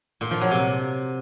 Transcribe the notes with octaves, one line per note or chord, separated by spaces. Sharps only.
A#2
F3
F#3
C3